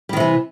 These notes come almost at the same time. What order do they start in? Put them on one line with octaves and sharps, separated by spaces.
G3 D#3 C3 E3